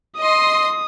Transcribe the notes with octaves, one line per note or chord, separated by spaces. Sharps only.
D#5 C6 D#6